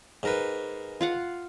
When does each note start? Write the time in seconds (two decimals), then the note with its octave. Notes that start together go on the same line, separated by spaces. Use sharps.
0.23 G#2 A#4 B4
1.01 F4 F5 F#5